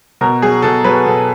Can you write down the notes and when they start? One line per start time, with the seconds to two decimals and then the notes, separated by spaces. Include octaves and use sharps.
0.21 B2 A#4
0.42 F#3 G#4
0.62 B2 A4
0.84 F#3 B4
1.06 B2 A4